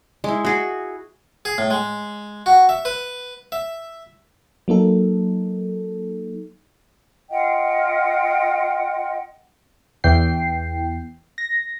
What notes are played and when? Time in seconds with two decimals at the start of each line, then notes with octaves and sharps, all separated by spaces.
0.24 G#3 E4
0.45 F#4 G#4
1.45 G#4
1.58 A2
1.70 G#3
2.46 F#4
2.69 E5
2.85 B4
3.52 E5
4.68 F#3 A#3 D#4 A4
7.30 F4 D#5 F#5 G5
10.04 E2 E3 G5 C7
11.38 A#6